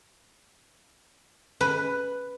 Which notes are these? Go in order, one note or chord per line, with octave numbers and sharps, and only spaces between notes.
B4